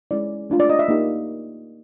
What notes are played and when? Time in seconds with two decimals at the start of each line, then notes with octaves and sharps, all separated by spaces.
0.11 G#3 C#4 E4 D5
0.50 A3 D4 F4
0.60 D5
0.69 D#5
0.79 E5
0.88 A#3 D#4 G4